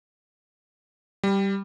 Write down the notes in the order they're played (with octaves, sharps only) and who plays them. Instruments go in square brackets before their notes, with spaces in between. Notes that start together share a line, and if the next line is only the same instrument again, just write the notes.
[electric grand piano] G3